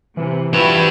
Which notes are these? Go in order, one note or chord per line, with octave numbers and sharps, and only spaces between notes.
C3 E3
F3 E4 F#4 G4 B4